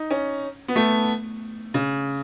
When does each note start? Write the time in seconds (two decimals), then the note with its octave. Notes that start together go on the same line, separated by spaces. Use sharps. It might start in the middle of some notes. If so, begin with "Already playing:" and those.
Already playing: D#4
0.11 C#4
0.68 B3
0.76 A3
1.74 C#3